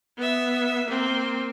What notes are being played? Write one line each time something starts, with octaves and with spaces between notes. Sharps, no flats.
B3 E5
A#3 C4